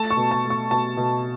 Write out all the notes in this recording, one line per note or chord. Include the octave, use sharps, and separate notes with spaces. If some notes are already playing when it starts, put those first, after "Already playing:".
Already playing: A3 A5
C#6
B2
A5
A3
C#6
B2 A5
B2